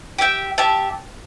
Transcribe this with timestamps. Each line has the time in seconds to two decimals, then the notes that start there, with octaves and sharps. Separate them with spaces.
0.18 G4 E5 G5
0.58 G4 E5 A5